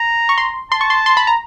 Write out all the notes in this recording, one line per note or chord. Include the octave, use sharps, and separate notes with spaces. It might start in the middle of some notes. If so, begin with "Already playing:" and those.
Already playing: A#5
C#6
C6
A5 C6
C#6
C6
C6
B5
A#5